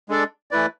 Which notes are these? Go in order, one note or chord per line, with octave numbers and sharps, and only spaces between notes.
G#3 D4 A4 D5
E3 A3 E4 B4 D5